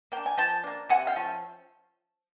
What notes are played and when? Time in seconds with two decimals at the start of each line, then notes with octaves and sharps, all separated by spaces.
0.12 A#3 D4 G5
0.26 G#5
0.37 F3 G5 A5
0.64 A#3 D4
0.89 C3 F#5 G#5
1.07 F5 G5
1.16 F3 A3 C#4